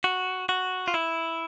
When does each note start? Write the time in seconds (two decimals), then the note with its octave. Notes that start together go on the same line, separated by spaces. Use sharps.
0.04 F#4
0.49 F#4
0.88 F4
0.94 E4